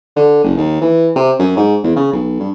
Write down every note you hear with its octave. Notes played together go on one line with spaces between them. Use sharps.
D3
F#1
D#2
E3
C3
F#2
G#2
E2
C#3
B1
G2